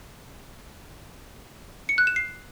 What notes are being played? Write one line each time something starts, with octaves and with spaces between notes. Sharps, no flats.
C#7
F#6
E7
C7